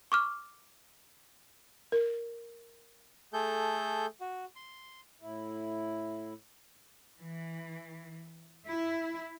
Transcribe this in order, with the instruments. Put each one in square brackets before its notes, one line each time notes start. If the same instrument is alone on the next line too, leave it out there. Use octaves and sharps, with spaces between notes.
[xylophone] C#6 D6 F6
[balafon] A#4
[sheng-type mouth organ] A3 G#4 A4 G6
F#4
C6
[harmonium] A2 E4
[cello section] E3
E4